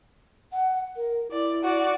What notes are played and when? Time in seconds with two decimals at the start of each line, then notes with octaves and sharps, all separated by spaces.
0.53 F#5
0.96 A#4
1.31 E4 D5
1.64 F#4 D5